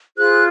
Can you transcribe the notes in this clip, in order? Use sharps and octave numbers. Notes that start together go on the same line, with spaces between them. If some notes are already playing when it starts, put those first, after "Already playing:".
F4 G#4 C5 F#6